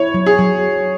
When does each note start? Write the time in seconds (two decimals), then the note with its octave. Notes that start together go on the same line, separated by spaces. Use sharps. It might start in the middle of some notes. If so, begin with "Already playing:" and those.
Already playing: E4 C#5
0.14 F#3
0.26 G#4
0.39 F#3